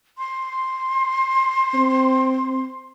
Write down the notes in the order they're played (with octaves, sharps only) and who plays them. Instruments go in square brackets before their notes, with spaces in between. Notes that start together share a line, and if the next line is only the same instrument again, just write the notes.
[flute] C6
[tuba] C4